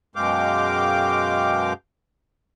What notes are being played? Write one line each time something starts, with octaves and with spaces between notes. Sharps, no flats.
F#2 B2 G#3 F5 G5 D6